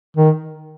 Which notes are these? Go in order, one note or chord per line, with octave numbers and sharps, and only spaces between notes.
D#3